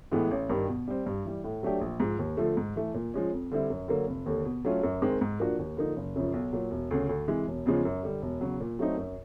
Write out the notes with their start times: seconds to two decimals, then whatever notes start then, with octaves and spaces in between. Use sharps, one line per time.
0.12 A2 E3 G#3 B3
0.31 A1
0.49 G2 D#3 G3
0.68 B2
0.88 G3 C4
1.06 G2
1.25 E3 G3
1.44 A2
1.63 F#3 A3 D4 G4
1.81 A#1
2.00 G#2 F3 G#3
2.19 D#2
2.37 D3 F3 A3
2.57 G#2
2.76 E3 A3
2.94 A#2
3.14 F3 G#3 C#4
3.32 F2
3.51 D3 G3 C4 E4
3.70 F#2
3.88 D3 F#3 A#3
4.07 F1
4.26 D#2 D3
4.45 B2
4.65 F#3 A3 C#4 F4
4.83 F#2
5.02 D#3 G#3 C4
5.21 G#2
5.40 F3 A#3 D4 F#4
5.59 D#2
5.77 D3 F3 A#3 D#4
5.96 F#1
6.16 F#2 C#3 F3
6.34 B1
6.53 A#2 F#3
6.71 E1
6.91 D2 C#3
7.09 D2
7.28 C3 E3 G#3
7.48 E1
7.66 E2 C#3 F3 G#3
7.85 F#2
8.03 D3 G3
8.22 E1
8.41 E2 C#3 F#3
8.60 A#2
8.79 F#3 A3 C4 D#4
8.97 F#2